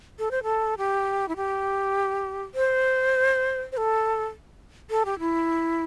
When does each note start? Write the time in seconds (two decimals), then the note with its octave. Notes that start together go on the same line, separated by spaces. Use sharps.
0.19 A4
0.31 C5
0.43 A4
0.78 G4
1.28 E4
1.36 G4
2.55 C5
3.72 C5
3.77 A4
4.90 A4
5.05 G4
5.19 E4